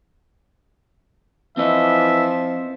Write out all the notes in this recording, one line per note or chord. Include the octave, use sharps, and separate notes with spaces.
E3 F3 C4 D#5 E5